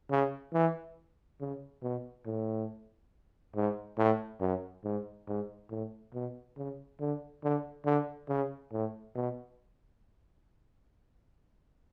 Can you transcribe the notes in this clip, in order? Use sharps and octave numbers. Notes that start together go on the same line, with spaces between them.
C#3
E3
C#3
B2
A2
G#2
A2
F#2
G#2
G#2
A2
B2
C#3
D3
D3
D3
C#3
A2
B2